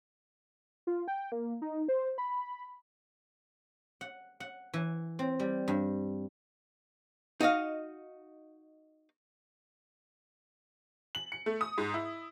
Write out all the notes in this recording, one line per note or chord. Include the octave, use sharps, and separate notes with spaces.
F4
G5
A#3
D#4
C5
B5
F#5
F#5
E3
C4
G3
G2
D#4 F#4 D#5 F5
F#7
C#7
A3
D#6
G#2
E4